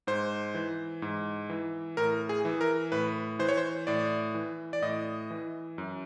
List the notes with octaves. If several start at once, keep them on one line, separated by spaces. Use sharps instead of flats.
G#2 C5
E3
G#2
E3
A2 A#4
G#4
E3
A#4
A2 B4
E3 C5
C#5
C5
A2 D5
E3
D5
A2 D#5
E3
F#2